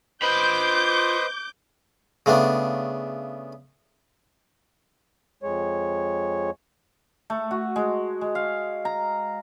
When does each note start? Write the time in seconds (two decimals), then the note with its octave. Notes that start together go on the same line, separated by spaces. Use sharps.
0.22 F4 B4 C5 D#5 B5 D6 G6
2.26 C#3 A3 B3 D4
5.43 F2 G#3 C#5
7.30 A3
7.51 F#4
7.76 G#3
8.21 G#3
8.35 F5
8.85 A#5